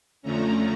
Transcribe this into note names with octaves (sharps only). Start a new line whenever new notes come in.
F2 D3 F3 A3 C#4 A#5